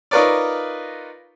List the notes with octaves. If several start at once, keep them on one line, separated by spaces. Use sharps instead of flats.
D#4 F4 A#4 B4 C#5 D5